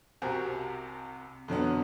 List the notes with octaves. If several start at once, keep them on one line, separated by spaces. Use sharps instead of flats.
C2 C3 C4 F#4 A#4 G#5
F2 D3 F#3 B3